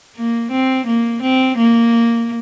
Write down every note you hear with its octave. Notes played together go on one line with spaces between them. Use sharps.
A#3
C4
A#3
C4
A#3